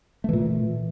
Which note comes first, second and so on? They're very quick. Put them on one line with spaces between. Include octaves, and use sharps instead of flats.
A3 E3 A#2